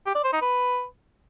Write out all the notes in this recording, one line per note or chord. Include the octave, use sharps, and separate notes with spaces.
G4
D5
C5
D#4
B4